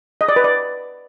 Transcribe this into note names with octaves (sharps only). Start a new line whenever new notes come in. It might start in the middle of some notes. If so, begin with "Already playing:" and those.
D#5
D5
B4
D5